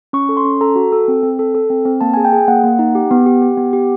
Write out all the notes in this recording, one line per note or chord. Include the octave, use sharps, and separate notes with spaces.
C#4 C#6
A4
C6
C#4
A4 A#5
F#4
A4
C4
C4
A4
A4
C4
C4
A#3 A5
G#4 G#5
G5
G#4
A#3 F#5
A#3
D#4
G4
B3
G4
G4
B3
G4